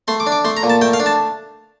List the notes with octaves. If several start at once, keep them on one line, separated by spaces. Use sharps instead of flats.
A3 C6
D6
D4
D6
A3 C6
A#5
A#2
A5
A3 G5
F5
D4
A5